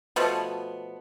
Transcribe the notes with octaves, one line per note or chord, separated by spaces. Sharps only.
B2 F3 A3 B3